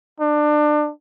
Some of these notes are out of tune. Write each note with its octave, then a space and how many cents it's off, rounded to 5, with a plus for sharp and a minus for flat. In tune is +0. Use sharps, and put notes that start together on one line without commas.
D4 +25